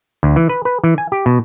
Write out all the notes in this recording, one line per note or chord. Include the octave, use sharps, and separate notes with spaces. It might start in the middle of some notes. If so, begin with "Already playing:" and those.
D2
E3
B4
B4
E3
G#5
G4
B2